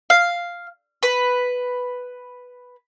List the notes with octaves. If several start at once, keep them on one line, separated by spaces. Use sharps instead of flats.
F5
B4